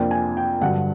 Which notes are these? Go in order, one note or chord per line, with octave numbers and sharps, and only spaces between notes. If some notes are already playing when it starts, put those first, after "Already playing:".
Already playing: F2 C3 F3 A#3 D4 G5
G#5
G5
G2 D3 F#3 F#5